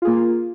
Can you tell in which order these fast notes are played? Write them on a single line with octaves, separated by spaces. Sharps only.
F4 G#4 A#3